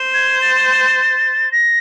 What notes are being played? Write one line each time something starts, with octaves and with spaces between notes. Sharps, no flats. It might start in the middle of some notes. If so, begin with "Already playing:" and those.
Already playing: C5
G#6
A6
A#6